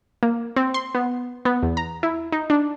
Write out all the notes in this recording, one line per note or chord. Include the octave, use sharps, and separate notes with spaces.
A#3
C4
C6
B3
B3
E2
A#5
E4
D#4
D4